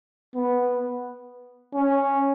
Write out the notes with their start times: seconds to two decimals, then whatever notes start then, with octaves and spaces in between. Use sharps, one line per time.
0.35 B3
1.74 C#4